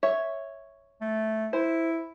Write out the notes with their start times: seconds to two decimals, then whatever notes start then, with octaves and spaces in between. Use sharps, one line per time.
0.03 C#5 E5
1.01 A3
1.53 E4 C5